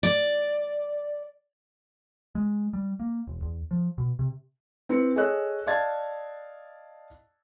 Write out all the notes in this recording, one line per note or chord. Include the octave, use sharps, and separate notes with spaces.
D5
G#3
G3
A#3
E1
E2
F3
B2
C3
C4 E4 B4 C#7
G#4 A4 C#5 D#5 E6 F#6
D5 D#5 F5 A5 G#6 A6